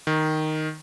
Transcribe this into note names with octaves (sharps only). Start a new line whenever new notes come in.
D#3